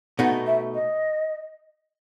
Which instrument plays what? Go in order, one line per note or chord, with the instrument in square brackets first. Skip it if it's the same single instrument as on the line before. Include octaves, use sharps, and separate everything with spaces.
[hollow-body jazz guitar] B2 A3 D#4 [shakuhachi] F#5
[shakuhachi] E5
D#5